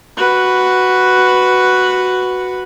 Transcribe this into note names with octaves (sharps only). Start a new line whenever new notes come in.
F#4 B4